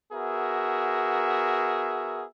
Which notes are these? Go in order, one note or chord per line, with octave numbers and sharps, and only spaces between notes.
B3 F#4 G#4 A#4 E5